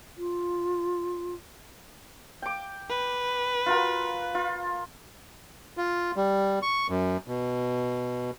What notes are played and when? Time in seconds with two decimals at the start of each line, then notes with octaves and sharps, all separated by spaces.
0.17 F4
2.42 G5 D6
2.90 B4
3.66 F4 F#4 A#4
4.35 F4
5.77 F4
6.16 G3
6.62 C#6
6.90 F#2
7.28 B2